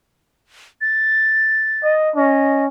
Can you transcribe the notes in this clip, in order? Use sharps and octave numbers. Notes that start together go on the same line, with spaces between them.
A6
D#5
C#4 D#5